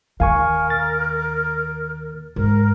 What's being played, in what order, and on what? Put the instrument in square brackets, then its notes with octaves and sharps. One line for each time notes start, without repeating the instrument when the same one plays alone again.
[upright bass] D#2 [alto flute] A#4 [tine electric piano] F5 G#5 C#6
[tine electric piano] A6
[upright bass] G#2 [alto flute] A#4